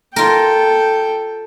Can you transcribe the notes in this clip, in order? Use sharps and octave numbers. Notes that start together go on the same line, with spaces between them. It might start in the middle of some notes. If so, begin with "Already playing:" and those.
F4 A4 A#4 G5